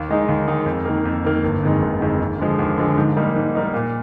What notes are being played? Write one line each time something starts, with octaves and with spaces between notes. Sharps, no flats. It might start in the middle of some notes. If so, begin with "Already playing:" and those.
Already playing: D#2
D#3 G#3 D#4
D#2
D#3 G#3 D#4
F2
D#3 A#3
F2
D#3 A#3
G1
F2 D#3 G#3
G1
F2 D#3 G#3
D#2
D3 F3 G#3
D#2
D3 F3 G#3
G#2
G3 A#3 D#4
G#2
G3 A#3 D#4
A#2